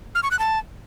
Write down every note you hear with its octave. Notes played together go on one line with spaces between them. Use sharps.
F6
C#6
F#6
A5